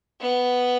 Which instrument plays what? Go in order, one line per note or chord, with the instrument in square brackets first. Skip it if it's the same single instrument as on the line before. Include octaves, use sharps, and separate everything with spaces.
[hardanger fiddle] B3